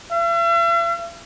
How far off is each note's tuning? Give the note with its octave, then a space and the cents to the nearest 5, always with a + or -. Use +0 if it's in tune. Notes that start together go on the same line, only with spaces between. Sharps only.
E5 +45